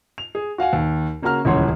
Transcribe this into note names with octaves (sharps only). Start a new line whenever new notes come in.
F7
G#4
F#4 F5 F#5 G#5
D#2
C#3 A#3 C#4 F#4 A#5 F6
D#1 C#2 E3 C#5 F#5 C6